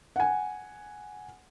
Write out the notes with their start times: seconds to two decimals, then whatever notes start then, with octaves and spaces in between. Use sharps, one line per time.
0.16 F#5 G#5